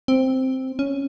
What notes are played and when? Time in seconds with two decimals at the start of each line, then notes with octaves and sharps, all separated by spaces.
0.08 C4
0.79 C#4